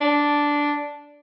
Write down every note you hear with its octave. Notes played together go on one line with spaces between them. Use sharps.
D4